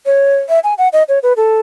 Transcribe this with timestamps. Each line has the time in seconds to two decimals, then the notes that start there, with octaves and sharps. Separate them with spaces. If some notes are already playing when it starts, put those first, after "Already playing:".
0.06 C#5
0.49 E5
0.64 G#5
0.78 F#5
0.93 D#5
1.09 C#5
1.23 B4
1.37 A4